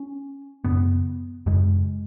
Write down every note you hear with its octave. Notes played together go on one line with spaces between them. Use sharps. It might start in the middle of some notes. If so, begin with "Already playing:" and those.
Already playing: C#4
F#2 C#3 B3
F#2 C#3 G#3